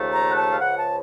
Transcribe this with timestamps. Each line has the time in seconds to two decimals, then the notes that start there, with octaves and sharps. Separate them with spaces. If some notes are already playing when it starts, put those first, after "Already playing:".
Already playing: D#2 C#3 F3 A3
0.12 A#5
0.30 F#5
0.36 A5
0.50 F5
0.60 C#2 C#3 F3 F#5
0.78 A5